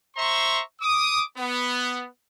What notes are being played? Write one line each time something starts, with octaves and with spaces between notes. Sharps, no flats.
C5 E5 A#5 C6 C#6
D6 D#6
B3